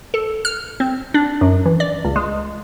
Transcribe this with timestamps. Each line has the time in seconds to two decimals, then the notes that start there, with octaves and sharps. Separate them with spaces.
0.14 A4
0.45 F6
0.80 C4
1.14 D4
1.41 F#2
1.65 E3
1.80 D5
2.05 C#2
2.16 G#3